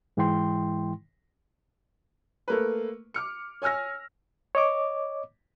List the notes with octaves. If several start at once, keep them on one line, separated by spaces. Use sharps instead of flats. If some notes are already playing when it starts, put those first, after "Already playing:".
G#2 E3 G#3 E4 G5 C6
A3 A#3 B4
D6 F6 C#7
C#5 G#5 E6 F6 A#6
C#5 D#5 D6